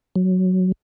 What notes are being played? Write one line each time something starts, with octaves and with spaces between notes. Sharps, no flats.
F#3